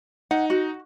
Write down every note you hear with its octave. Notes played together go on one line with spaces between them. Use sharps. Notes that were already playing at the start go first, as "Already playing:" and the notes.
D#4 F#5
F#4